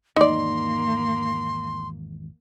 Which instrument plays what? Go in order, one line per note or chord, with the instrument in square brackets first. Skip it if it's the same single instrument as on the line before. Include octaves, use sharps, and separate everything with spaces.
[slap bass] G#1 E2 G#2 [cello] A#3 [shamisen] D#4 D5 [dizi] C6